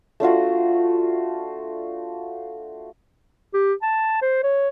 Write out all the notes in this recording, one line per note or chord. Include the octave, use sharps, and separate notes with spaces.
A3 D4 F4 F#4
G4
A5
C5
C#5